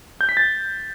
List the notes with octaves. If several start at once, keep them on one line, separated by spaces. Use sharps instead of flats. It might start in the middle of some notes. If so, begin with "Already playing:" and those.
G6
B6
A6